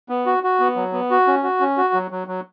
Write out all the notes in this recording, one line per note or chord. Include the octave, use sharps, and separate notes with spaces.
B3
F#4
F#4
B3
F#3
B3
F#4
C#4
F#4
C#4
F#4
F#3
F#3
F#3